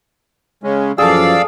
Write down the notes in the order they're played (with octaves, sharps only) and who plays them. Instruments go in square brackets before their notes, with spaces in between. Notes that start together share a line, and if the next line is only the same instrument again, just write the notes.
[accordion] C#3 G#3 C#4
[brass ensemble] F#2 E3 F3 [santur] G#4 A4 [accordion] D5 F5 E6